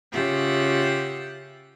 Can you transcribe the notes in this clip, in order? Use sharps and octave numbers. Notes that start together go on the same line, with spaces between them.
C#3 F4 G4 E5 F#5